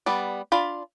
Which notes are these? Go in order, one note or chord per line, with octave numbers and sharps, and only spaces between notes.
G3 B3 D5
D4 F4 B5